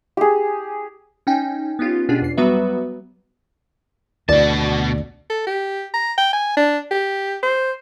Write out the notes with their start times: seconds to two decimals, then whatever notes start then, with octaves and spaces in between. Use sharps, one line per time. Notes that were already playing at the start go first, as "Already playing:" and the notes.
0.17 G4 G#4
1.27 C#4 D#4 G5 G#5
1.79 B3 C#4 D#4 F4 G4
2.09 B2 C#4 D4 F4 G4 G#4
2.22 E2 C7
2.37 F#3 G3 B3 F#4 B4 E5
4.29 D2 B2 D5 A5
5.30 A4
5.47 G4
5.94 A#5
6.18 G5
6.33 G#5
6.57 D4
6.91 G4
7.43 C5